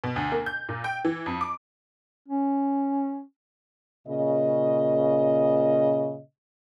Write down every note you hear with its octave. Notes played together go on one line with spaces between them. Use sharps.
B2
D2
A#3
G6
A#2
G5
E3
F2
D6
C#4
A#2 C#3 D#5